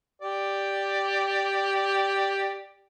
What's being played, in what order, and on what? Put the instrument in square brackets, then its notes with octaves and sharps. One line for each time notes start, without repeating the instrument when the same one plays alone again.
[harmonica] G4 D5